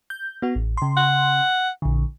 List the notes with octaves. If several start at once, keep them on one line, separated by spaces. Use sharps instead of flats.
G6
B3 F#4
A1
C#3 C6
F#5
A#1 D3